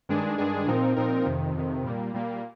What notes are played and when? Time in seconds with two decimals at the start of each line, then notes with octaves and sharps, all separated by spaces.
0.09 G2 D#3 G#3 D4 G#4
0.38 G2 D#3 G#3 D4 G#4
0.67 A#2 F3 C4 D#4 A#4
0.96 A#2 F3 C4 D#4 A#4
1.26 F2 C3 D#3
1.55 F2 C3 D#3
1.84 A#2 G3 A#3
2.14 A#2 G3 A#3